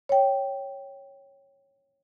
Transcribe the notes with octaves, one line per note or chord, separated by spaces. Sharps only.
C#5 G5